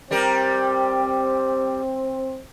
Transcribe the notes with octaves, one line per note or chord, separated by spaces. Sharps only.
G3 C4 G4 A#4